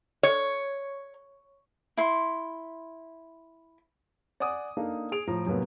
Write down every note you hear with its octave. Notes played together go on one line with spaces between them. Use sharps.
C#5
E4 C6
D5 F#5 G#5 D6 D#6
A#3 D4 D#4 A4 F5
G#4 D7 F7
A2 F3 A#5
F#2 A2 C3 A#3 B3